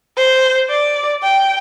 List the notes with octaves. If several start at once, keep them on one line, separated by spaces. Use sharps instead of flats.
C5
D5
G5